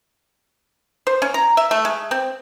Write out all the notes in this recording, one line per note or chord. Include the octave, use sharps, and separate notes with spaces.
C5
C#4
A#5
E5
A3
G#3
C4